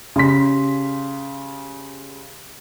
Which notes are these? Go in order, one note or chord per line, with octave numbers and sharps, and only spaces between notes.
C#3 G4 C6 B6